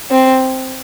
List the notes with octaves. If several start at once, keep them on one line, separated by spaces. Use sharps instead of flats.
C4